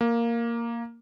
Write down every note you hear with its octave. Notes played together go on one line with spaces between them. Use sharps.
A#3